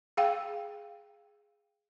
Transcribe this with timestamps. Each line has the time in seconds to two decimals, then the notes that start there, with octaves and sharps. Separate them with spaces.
0.17 G#4 F5 G5